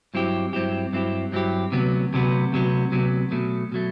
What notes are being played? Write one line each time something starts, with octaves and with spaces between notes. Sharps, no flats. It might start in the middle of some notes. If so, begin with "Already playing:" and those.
G2 F#3 C4 E4 G4
G2 F#3 C4 E4 G4
G2 F#3 C4 E4 G4
G2 F#3 C4 E4 G4
D2 C3 F#3 B3
D2 C3 F#3 B3
D2 C3 F#3 B3
D2 C3 F#3 B3
B2 F#3 A3
B2 F#3 A3